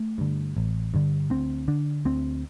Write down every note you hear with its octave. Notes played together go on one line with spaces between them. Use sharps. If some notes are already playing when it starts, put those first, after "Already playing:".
Already playing: A3
G2 D3
A1
G2 D3
D2 C4
D3 D4
D2 C4